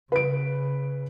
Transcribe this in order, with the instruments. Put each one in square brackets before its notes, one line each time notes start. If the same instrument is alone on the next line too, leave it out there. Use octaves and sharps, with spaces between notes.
[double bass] C#3 [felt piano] B4 D7